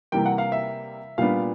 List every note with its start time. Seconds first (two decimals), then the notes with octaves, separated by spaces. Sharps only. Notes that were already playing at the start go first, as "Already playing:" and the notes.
0.12 C3 E3 G3 A#3 G5
0.26 F#5
0.38 F5
0.52 E5
1.18 A#2 G3 B3 D4 F5